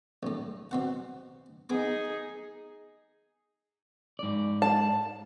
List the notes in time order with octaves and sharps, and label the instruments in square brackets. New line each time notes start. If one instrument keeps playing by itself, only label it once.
[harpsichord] A#1 A2
B2 C4 F#5
[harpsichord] B3 D6 [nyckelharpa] D#4 G#4
[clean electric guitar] G#2 D5
[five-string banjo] A5